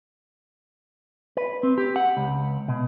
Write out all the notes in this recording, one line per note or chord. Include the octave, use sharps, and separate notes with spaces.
B4
C4
G4
F#5
C#2
B2